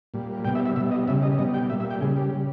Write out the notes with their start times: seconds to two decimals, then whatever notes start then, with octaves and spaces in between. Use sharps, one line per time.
0.14 A#2 G3
0.44 G3 G5
0.47 B2
0.55 E5
0.66 E5
0.76 B2 G3 E5
0.91 D#5
1.08 C#3 G3 E5
1.23 D#5
1.38 B2 G3 D#5
1.54 G5
1.70 A#2 G3 E5
1.80 E5
1.90 G5
2.01 C#3 G3 G#4
2.17 G4
2.33 C#3 G3